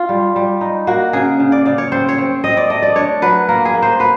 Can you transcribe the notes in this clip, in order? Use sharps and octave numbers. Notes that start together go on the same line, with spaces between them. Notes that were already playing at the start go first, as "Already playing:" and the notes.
Already playing: F4
G3
G3
D#4
A#3 F#4
C#3 G#4
C#3
D5
C#3 D5
C#5
C4 C5
C#5
C4
C4 D#5
D5
A3 D#5
D5
D4 C#5
F#3 B4
A#3 A#4
G#4
A#3
C5
B3 B4